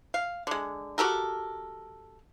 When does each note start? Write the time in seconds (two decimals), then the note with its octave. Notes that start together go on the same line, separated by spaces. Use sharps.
0.14 F5
0.47 D3 G#3
0.98 F#4 G4 A4 A#4